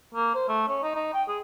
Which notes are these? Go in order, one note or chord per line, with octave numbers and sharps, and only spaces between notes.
A#3
C5
A3
C#4
D#4
D#4
G5
G#4